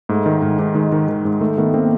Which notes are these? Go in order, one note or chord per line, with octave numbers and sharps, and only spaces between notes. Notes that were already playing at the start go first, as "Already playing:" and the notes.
G#2 A3
D#3
G#2
G#2
D#3 G#3
D#3
D#3
G#2
D#3 A3
D#3 A3 B3
A#3 C4